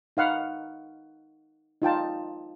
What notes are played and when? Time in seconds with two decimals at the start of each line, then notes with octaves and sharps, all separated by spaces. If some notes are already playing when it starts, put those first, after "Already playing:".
0.17 D#4 F5 F#5 B5
1.82 D#4 F4 G5 A5